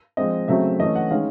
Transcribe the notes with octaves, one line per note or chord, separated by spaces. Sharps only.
F3 G#3 C4 D#5
C#3 F#3 A3 C4 E5
E3 A3 C#4 D#5
F#5
D#3 G#3 C#4 F5